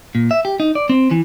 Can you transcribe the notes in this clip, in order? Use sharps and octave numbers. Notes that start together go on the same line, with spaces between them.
A#2
E5
G4
D#4
D5
C4
E3